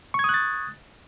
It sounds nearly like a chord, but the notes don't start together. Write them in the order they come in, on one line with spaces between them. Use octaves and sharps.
C#6 G#6 D#6 F#6 A6